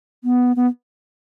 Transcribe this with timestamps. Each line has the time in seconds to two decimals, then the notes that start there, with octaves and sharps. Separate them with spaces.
0.24 B3
0.56 B3